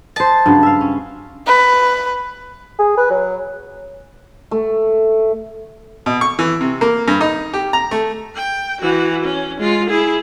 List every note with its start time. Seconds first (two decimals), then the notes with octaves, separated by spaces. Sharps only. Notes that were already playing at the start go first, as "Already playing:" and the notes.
0.16 C5 D#5 A5
0.46 G2 C#3 F#3
0.63 E5 F5
0.81 C#4
1.46 B4
2.79 G#4
2.97 B4
3.11 F#3
4.51 A3
6.06 B2
6.21 C#6
6.39 E3
6.61 C3
6.81 A#3
7.08 G2
7.21 D#4
7.54 G4
7.73 A#5
7.91 A3
8.36 G5
8.81 E3 F#4
9.24 C#4
9.59 G#3 F4
9.90 E4 G#4